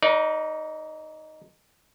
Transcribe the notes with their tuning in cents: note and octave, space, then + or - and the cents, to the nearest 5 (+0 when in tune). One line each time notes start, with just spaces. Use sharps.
D#4 +0 B4 -45 D5 -35